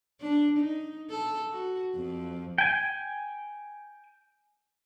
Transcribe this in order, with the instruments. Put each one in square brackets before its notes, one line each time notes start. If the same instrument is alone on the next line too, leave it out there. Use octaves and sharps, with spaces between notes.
[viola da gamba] D4
D#4
A4
F#4
F2
[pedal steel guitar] G5 G#5